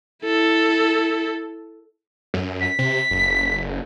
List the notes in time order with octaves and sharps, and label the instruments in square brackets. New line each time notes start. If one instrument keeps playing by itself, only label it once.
[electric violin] E4 A4
[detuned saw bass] F#2
[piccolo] B6
[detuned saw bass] C3
F#1